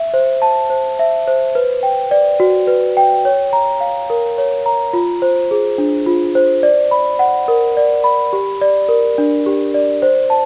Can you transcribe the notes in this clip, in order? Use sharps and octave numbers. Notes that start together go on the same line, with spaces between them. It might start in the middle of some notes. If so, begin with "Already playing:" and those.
Already playing: E5
C5
A5
C5
E5
C5
B4
G5
D5
F#4
B4
G5
C#5
A#5
F5
A#4
C#5
A#5
F4
C5
G#4
D4
F4
C5
D5
B5
F#5
A#4
D5
B5
G4
D5
A#4
D4
G4
D5
C5
A5